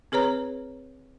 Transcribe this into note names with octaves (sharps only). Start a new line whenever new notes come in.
C4 G#4 B4 C#5 A#5